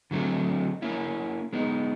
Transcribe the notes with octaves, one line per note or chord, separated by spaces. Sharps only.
D3 F#3 A3 C4
A#3 C#4 E4
G#3 B3 D#4